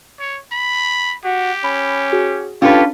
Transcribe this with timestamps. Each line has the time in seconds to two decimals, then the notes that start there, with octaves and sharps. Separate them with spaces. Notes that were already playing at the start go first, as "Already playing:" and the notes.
0.20 C#5
0.52 B5
1.24 F#4 G4
1.64 C#4 B5
2.12 F#4 G#4
2.62 C#4 D4 F4 G4 A4 B4 C#5